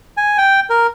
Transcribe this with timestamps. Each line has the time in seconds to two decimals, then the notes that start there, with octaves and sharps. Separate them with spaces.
0.17 G#5
0.38 G5
0.70 A#4